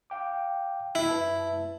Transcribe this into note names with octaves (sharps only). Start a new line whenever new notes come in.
F5 G5 D6
E4
F#2 B4 A5